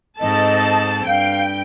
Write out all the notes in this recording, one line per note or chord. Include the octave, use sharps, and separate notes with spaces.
G#2 C4 A4 D#5 A5
G2 F5 G5